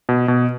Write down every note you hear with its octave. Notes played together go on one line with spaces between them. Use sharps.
B2
B2